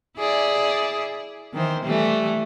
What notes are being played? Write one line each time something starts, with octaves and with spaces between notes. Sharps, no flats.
E4 G#4 D5
D#3 E3 C5
E3 G3 A3